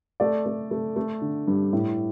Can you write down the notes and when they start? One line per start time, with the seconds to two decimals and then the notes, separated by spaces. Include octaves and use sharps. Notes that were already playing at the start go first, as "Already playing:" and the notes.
0.20 A3 D5
0.46 A3
0.71 A3
0.96 A3
1.21 D3
1.47 G2
1.73 A2